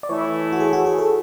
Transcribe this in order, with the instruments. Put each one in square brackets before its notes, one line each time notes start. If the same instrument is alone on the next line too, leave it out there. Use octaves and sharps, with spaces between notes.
[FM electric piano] D5
[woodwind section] E3 A3 E4 [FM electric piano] C#5
[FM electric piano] F#4
G#4
F#4
G#4
A4